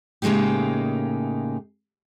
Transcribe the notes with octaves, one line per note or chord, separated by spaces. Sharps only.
A2 C#3 G#3 A#3 D#4 G4